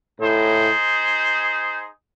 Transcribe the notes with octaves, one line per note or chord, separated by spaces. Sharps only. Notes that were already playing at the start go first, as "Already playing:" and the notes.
A2 D#4 G#4 C5